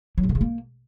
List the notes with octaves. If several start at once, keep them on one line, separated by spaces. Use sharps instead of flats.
F#3
C3
D3
C#3
A#3